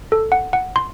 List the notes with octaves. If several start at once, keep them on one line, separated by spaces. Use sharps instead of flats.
A4
F#5
F#5
C6